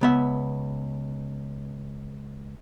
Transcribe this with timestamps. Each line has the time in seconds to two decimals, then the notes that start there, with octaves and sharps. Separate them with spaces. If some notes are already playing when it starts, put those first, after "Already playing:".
0.01 C#2 B3 E5